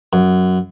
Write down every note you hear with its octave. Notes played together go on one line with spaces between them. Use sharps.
F#2